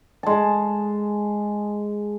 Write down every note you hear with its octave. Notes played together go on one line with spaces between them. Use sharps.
G#3 A5